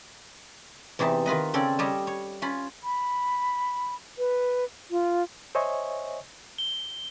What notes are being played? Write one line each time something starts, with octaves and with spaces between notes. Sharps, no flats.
E2 C3 E3 D#4 A5
D#3 F4 B4 D#5
C#3 C4 C#4 A4 D5 G5
G3 G4 C#5 D#5 A5
C#5
C#4 F4 B5
B5
B4
F4
C5 C#5 D#5 E5 G#5 C#6
G7